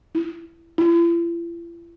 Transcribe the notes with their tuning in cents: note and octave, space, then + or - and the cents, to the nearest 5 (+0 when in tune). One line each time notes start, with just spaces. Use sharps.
E4 +15
E4 +45